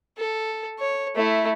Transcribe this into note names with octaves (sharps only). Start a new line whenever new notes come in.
A4
C#5
A3 E4